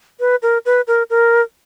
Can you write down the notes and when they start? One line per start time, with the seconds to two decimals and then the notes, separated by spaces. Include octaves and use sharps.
0.20 B4
0.42 A#4
0.66 B4
0.87 A#4
1.10 A#4